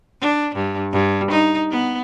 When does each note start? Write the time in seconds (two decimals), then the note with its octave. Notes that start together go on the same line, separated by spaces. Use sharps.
0.21 D4
0.55 G2
0.92 G2
1.31 D#4
1.71 B3